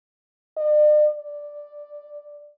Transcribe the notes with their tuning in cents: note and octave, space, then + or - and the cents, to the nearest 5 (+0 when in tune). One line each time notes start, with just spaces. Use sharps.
D5 +45
D5 +0